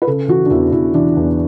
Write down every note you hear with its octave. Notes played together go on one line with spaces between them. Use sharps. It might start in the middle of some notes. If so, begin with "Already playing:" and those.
B4
C#3 A4
E3 F#4
D4
E2 E4
E2 E4
E3 D4
E2